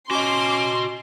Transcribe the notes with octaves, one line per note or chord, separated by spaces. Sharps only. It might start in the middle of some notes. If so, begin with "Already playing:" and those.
C#4 F#4 D#5 C6 D6